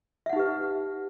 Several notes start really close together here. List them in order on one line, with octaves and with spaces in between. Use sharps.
E5 F#5 D#4 G4 B4